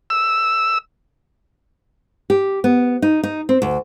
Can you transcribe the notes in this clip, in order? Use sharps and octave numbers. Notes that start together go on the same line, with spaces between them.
E6
G4
B3
D#4
D#4
C4
D2